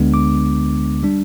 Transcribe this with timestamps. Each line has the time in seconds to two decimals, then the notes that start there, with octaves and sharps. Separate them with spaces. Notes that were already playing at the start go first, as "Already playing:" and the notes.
Already playing: D2 D3 G#3 B3 D4
0.14 D6
1.03 G3 D4